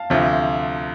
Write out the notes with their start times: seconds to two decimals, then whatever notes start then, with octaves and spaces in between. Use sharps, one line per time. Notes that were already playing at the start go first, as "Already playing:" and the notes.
Already playing: F5 A5
0.10 D2 C3 F3